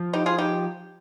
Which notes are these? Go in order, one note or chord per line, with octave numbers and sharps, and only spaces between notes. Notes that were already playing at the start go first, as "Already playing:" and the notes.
Already playing: F3
D#4 G4
F4 G#4
D#4 G4